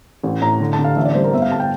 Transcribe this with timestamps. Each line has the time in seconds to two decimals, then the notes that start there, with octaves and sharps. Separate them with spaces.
0.23 A1
0.41 A2 A#5
0.60 D3
0.73 A5
0.78 D3
0.84 F5
0.96 A1 E5
1.05 D5
1.14 G3 C5
1.24 A#4
1.33 G1 E5
1.42 F5
1.51 G1 A5
1.60 G5